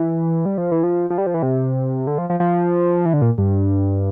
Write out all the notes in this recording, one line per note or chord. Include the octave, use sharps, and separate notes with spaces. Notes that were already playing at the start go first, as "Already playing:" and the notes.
Already playing: E3
G3
F3
E3
F3
F3
G3
F3
E3
C3
D3
F3
F3
F3
E3
D3
A#2
G2